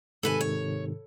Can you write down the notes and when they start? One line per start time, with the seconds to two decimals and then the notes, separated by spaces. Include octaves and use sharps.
0.23 G#2 C3 D#3 A4 B4 G#5
0.41 C#5